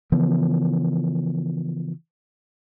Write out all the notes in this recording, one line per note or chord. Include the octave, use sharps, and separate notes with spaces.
C#3 E3 F3 B3